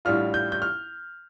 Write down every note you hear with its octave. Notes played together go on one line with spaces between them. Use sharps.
A1 A2 G3 D4 F4 F6
G6
G6
F6